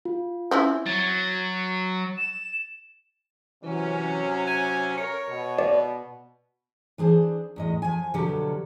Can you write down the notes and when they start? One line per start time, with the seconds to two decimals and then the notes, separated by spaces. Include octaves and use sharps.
0.05 F4
0.51 C4 C#4 E4
0.86 F#3 A6
2.17 E7
3.64 C3 E3 F#3 C#4
4.47 G#5
4.98 A#4 C#5
5.29 B2
5.59 D5
6.98 E3 D4 G#4 C5
7.56 E2 A2 D#5
7.82 F3 G#5
8.14 B2 D3 F3 F#3 G4 A4